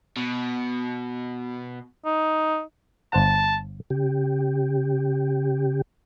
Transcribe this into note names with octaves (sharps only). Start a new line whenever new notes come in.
B2
D#4
G1 C5 F#5 A5
C#3 G4